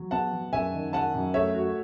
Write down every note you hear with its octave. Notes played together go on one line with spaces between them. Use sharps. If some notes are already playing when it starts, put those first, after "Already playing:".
Already playing: F#3
B3 F#5 A5
F#3
F#2 E5 G#5
D#3
F#2 F#5 A5
F#2
A3 C#5 E5
F#4